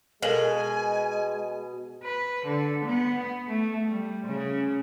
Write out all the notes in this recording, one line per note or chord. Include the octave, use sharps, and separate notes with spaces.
B2 G#3 A4 A#4 F5 G#5
B4
D3
B3
A3
G3
C#3